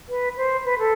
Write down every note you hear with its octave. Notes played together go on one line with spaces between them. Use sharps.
B4
C5
B4
A4